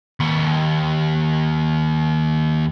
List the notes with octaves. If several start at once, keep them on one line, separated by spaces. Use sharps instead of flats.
D#2 C6